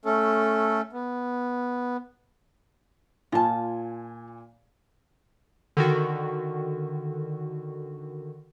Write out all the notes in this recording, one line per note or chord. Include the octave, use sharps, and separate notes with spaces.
A3 C#4 A4
B3
A#2 F4 G#5 A5
D3 D#3 F#4